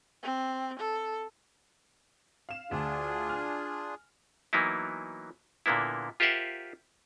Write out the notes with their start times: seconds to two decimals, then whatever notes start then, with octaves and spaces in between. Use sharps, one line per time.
0.23 C4
0.79 A4
2.49 F5 E7
2.71 D2 D4 F4 G#4
3.29 G#5 F6
4.53 E3 F#3 A#3 B3 D#4 E4
5.66 A#2 D3 A#3 B3 E4
6.20 F4 G4 A#4 C5 E5 F#5